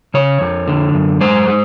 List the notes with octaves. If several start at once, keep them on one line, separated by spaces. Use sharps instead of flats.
C#3 C#5
F2
D3
F#2
G#3 C5
G#3